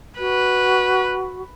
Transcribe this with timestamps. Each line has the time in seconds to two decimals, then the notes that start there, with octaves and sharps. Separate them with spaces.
0.19 F#4 B4